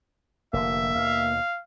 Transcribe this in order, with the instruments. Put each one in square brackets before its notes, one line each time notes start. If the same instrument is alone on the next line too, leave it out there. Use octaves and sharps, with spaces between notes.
[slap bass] F1 D3 [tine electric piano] A#3 [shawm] E5
[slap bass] D#2 B2 [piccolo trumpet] F5